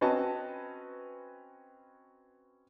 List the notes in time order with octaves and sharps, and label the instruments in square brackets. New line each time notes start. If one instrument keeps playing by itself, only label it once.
[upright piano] C4 C#4 F#4 B4 D#5 A5